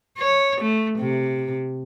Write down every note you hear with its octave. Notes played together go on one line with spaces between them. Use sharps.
C#5
A3
C3